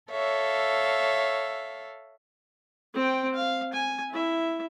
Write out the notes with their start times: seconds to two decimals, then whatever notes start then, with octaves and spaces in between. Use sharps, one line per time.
0.10 A4 C#5 E5 F5
2.94 C4 G5
3.35 F5
3.73 G#5
4.11 E4 E5